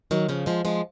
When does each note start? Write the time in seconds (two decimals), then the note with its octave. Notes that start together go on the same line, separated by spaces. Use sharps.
0.11 D#3 F#3
0.29 C#3 F3
0.46 F3 G#3
0.65 F3 G#3